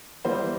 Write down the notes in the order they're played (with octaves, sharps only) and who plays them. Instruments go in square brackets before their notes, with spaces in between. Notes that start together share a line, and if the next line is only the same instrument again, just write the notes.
[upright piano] E2 E3 G3 C5